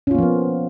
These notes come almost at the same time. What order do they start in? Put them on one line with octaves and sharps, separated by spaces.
C#4 F4 A#3 F3 B3